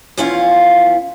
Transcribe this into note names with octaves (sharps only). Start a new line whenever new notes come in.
E2 F3 C#4 E4 F4 F5